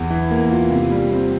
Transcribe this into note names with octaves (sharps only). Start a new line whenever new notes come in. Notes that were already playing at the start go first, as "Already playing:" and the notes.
Already playing: E2
E3
A#3
F4
C3
G3
C4